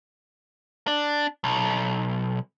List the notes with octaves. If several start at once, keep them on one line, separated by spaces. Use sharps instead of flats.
D4
B1